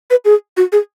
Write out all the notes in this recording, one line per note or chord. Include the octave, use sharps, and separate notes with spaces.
B4
G#4
F#4
G#4